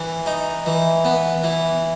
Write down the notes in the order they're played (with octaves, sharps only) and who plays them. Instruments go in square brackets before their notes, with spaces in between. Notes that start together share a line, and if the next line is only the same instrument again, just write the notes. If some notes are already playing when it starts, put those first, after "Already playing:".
Already playing: [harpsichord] E3
D#4
E3
B3
E3